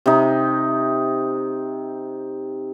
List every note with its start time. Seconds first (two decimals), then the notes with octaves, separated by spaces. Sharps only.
0.06 C3 D#4